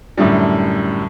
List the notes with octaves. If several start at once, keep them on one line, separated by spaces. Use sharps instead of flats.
F#2 A2 D3 G3